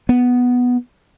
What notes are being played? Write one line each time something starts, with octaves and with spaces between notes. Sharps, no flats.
B3